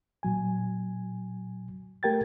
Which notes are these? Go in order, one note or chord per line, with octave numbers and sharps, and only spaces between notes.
A#2 F#3 G#5
A3 G4 A#4 G5 G#6 A6